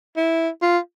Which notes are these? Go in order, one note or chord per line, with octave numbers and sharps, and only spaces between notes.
E4
F4